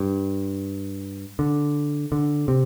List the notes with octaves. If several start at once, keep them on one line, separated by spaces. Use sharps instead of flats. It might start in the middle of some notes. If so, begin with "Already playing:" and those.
Already playing: G2
D3
D3
C3